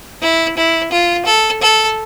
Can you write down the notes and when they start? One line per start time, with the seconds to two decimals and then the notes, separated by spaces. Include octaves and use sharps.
0.22 E4
0.57 E4
0.91 F4
1.26 A4
1.62 A4